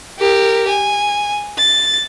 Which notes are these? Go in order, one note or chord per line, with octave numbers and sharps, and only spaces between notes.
G4 A#4
G#5
A6